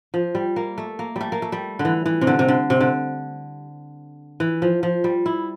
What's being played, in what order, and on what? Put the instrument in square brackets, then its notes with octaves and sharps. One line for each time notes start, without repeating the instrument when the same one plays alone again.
[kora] F3
G3
A#3
A3
A#3
G3 A3
A#3
A3
G3
D3
E3
E3
C3
D3
C3
D3
C3
D3
E3
F3
F3
G3
E4